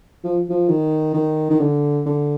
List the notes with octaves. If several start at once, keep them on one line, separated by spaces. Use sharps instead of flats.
F3
F3
D#3
D#3
D#3
D3
D3